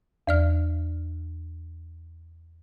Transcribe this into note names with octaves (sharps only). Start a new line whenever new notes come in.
E2 D5 F6